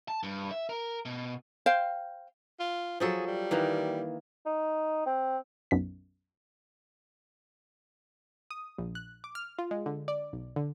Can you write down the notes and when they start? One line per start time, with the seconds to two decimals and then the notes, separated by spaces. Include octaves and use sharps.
0.08 A5
0.23 G2
0.51 E5
0.69 A#4
1.05 B2
1.66 C5 F5 G5
2.60 F4
3.00 F3 F#3 G#4 A4
3.27 G3
3.51 D#3 E3 A#3
4.46 D#4
5.06 C4
5.71 B1 F#2 B6
8.51 D#6
8.78 A#1
8.95 F#6
9.24 D6
9.35 F6
9.58 F4
9.71 G#3
9.86 D3
10.08 D5
10.33 B1
10.56 D3